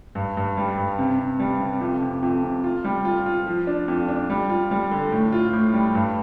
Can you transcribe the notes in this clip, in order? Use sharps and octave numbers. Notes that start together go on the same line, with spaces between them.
G2
G2
G3
G2
C3
C3
G3
C3
F2
C3
F2
C3
F4
G3
F4
F4
F3
D4
F2
D4
G3
F4
G3
D3
A2
F4
A2
G3
G2